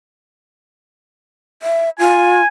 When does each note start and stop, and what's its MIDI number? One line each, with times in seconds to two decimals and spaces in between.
1.63 1.90 76
1.99 2.41 65
1.99 2.47 80